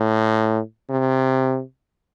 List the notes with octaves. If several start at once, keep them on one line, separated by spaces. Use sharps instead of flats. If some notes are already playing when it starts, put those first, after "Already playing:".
Already playing: A2
C3